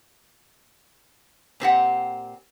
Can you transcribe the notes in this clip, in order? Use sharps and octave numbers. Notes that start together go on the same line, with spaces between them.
A#2 C4 G4 F#5